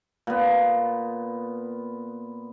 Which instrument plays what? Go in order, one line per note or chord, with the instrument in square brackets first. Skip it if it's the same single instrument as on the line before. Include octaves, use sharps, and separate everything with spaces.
[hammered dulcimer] A#2 B3